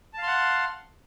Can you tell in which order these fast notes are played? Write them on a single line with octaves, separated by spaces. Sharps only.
A5 F5 C6 F#5